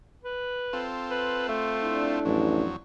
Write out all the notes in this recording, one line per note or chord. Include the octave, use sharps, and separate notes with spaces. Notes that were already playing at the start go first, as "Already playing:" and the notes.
B4
C4 F4 A4
B4
A3
D4 E4
A1 F2 F#3